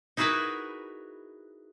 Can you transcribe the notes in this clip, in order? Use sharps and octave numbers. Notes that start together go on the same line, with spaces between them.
D#4 E4 F#4 G#4 A#4 B4